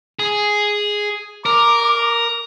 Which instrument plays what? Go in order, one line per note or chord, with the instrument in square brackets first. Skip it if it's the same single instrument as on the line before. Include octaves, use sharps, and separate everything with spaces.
[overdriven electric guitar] G#4
[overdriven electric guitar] A#4 [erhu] D6